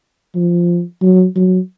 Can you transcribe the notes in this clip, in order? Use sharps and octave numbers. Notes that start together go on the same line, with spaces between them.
F3
F#3
F#3